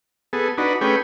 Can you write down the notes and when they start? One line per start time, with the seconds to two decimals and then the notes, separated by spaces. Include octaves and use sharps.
0.33 B3 G#4 A4
0.58 D4 D#4 F#4 B4
0.81 A3 C#4 G#4 B4 G5